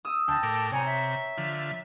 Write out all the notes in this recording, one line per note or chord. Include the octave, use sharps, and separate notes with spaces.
D#6 E6
D2 G5 A5 A#6
A2 A#4 D6
C3 C#5 G#5 A#5
E5
D3 F3